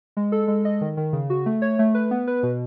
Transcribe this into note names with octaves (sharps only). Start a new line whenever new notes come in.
G#3
A4
G#3
D#5
D#3
D#3
C#3
F#4
A3
C#5
A3
B4
B3
B4
B2